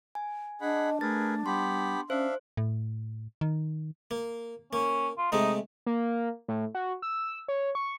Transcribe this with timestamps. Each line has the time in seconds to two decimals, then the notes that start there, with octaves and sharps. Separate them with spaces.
0.15 G#5
0.61 D4 G#4 D#5 F#5 B5
1.01 A3 G#4 A#4 B4 A6
1.46 G3 B3 G4 B5 C6
2.10 C#4 D4 C5 E5 F5
2.57 A2
3.41 D#3
4.11 A#3
4.73 A#3 C#4
5.18 F4
5.32 C3 G#3 A3 D#4
5.86 A#3
6.48 A2
6.75 F#4
7.02 E6
7.48 C#5
7.75 C#6